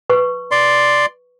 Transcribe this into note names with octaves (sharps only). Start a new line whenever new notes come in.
B4 C#6
D5 C6